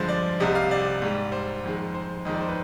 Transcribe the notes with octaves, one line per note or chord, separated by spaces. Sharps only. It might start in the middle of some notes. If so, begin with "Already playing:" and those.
Already playing: G2 D3 F3 G#3 C5
D5
C2 C3 G3 D#5
F5
D5
G#2 G3
C5
F2 D#3 G#3
C5
F2 D#3 G#3 D#5
D5
C5
B4